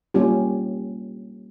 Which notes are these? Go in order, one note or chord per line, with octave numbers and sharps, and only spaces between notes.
G3 A#3 C#4 F4 G4